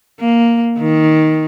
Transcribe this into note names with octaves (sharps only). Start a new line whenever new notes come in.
A#3
D#3